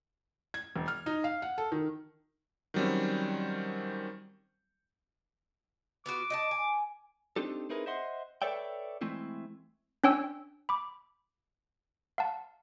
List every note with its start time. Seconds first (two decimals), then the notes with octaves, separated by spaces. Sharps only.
0.54 G#6
0.76 E1
0.88 F6
1.06 D#4
1.24 F5
1.42 F#5
1.58 A4
1.72 D#3
2.74 D#3 F#3 G3 C4 C#4
6.06 B3 F4 F#4 D6
6.30 D#5 F#5 A5
6.51 G#5
7.36 C4 D4 D#4 G4 A4
7.69 C4 D#4 E4 G#4 A#4 B4
7.86 C5 D#5 E5 F#5 C6
8.42 A4 B4 C#5 D5 E5 G5
9.01 E3 G#3 A3 C4 E4
10.04 C#4 D4 C#5 G5 G#5 E6
10.69 B5 D6
12.18 F5 F#5 A5